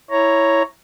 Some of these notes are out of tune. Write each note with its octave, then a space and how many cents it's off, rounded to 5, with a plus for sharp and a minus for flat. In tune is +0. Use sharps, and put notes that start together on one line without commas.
E4 +0 C#5 +0 A#5 +0